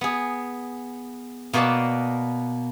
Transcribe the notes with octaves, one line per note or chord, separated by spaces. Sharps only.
B3 G#4
B2 A#3 B3 B4 D5 A5